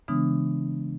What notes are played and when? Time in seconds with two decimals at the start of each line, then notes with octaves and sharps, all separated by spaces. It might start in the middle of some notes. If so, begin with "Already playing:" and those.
0.08 C#3 E3 G#3 B3 D4 D#6